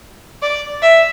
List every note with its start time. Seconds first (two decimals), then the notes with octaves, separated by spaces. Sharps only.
0.42 D5
0.82 E5